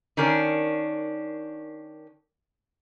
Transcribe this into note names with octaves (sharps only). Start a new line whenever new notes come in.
D#3 C#4 D4 A#4